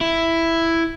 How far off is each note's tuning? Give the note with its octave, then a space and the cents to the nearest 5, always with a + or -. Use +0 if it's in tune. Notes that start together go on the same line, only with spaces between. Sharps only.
E4 +5